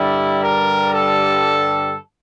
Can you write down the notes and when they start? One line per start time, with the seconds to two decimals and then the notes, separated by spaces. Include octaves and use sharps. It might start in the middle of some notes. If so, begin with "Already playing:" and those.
Already playing: G2 D3 G3 E4
0.41 A#4
0.93 A4